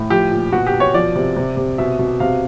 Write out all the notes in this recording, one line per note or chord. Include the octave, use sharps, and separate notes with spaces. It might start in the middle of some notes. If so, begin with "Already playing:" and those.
Already playing: A2
F3 G4
A#2
B2 F#4
G4
B2
C#5
F3 D5
C3
C3
C3
B2 E5
B2
C3 F5